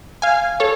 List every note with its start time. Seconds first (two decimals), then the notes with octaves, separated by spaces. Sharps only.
0.22 F5 G#5
0.60 A4 C#5